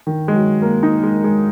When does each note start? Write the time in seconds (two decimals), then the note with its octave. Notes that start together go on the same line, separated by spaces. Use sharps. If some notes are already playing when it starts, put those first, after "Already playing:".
0.07 D#3
0.28 G#3
0.34 F#3
0.62 A#3
0.83 D#4
1.03 G#3
1.24 G#3